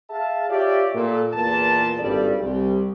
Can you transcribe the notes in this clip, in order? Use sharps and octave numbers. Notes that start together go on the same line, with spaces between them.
G#4 E5 F5 A5
F4 G4 C#5 D5 E5 F5
A#2 A4
E2 A#2 A5
G#1 G2 G3 A4 D5
C2 G3